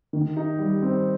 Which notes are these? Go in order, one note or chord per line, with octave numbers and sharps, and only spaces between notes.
D#3
D#4
G3
C4